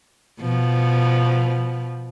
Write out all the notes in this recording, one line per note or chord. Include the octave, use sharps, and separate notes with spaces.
B2 F3